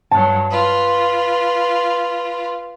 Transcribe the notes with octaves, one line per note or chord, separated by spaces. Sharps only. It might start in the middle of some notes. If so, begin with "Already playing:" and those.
G2 F#3 A5
F4 B4